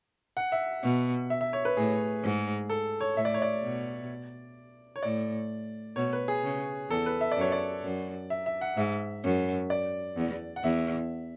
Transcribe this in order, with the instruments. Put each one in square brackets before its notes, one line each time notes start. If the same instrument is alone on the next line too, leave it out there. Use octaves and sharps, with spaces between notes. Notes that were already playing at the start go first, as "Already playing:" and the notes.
[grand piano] F#5
E5
[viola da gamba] B2
[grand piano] E5
E5
C#5
B4
[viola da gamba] A2 [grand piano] G#4
[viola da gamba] G#2
[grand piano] A4
C#5
[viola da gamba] A2 [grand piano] E5
[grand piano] D5
C#5
D5
[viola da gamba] B2
[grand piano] C#5
[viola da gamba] A2 [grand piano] D5
[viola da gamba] B2 [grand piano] C#5
[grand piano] B4
G#4
[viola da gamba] C#3
[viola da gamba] E2 [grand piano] A4
[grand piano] B4
E5
D5
[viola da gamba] F#2 [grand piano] C#5
[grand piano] D5
[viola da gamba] F#2
[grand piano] E5
E5
F#5
[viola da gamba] G#2 [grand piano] E5
[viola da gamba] F#2
[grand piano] D5
[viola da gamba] E2
[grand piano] F#5
[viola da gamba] E2 [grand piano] E5